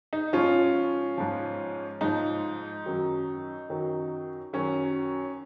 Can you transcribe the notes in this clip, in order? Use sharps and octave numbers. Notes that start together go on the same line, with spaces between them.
D#4
G#2 F3 C#4 F4
G#2 F3
G#2 F3 D#4
F#2 D#3 F#3
F#2 D#3 F#3
F#2 D#3 F#3 C#4